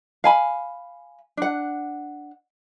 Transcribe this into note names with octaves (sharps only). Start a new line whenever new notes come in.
F5 G#5 B5
D4 F#5